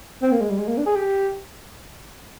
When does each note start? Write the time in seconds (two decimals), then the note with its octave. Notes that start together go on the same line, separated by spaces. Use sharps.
0.23 C4
0.32 A#3
0.41 G#3
0.50 G3
0.59 G#3
0.68 A#3
0.78 D4
0.86 G#4
0.96 G4